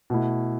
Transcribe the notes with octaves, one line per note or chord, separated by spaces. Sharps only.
B2 A3 E4